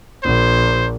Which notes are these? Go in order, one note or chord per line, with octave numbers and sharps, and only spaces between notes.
A#1 C5